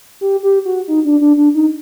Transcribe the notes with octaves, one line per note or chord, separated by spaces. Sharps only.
G4
G4
F#4
D#4
D4
D4
D4
D#4